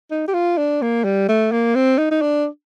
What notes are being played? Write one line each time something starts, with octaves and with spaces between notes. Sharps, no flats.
D#4
G4
F4
D4
A#3
G3
A3
A#3
C4
D#4
D#4
D4